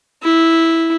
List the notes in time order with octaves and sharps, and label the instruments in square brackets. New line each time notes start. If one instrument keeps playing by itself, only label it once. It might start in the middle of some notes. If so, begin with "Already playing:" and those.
[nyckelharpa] E4